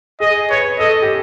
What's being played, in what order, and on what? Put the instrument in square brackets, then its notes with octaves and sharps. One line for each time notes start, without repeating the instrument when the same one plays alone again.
[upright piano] G#4 [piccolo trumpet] D#5
[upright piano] B4 [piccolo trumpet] C#5
[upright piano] A4 [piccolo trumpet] D#5
[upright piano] G4